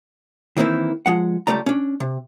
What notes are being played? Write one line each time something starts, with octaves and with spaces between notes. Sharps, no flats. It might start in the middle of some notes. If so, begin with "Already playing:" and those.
D#3 E3 A#3 C4 E4
F3 G#3 F#5
C#2 C3 G3 A3 D5 A#5
C#4 D4
C3